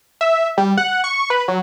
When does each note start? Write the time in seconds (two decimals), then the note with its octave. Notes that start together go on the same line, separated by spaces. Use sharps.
0.21 E5
0.57 G3
0.77 F#5
1.04 C#6
1.30 B4
1.48 F#3